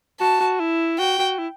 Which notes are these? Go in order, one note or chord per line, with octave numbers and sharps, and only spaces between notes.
F#4 A5
F#4
E4
F#4 G5
F#4
E4